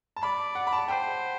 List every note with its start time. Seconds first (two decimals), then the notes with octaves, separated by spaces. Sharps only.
0.16 A5
0.22 D5 B5
0.55 F#5
0.67 B5
0.73 A5
0.88 C5 G5